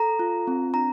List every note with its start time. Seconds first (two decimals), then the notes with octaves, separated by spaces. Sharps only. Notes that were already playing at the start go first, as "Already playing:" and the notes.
Already playing: A4 A#5
0.19 F4
0.47 C4
0.74 D4 A#5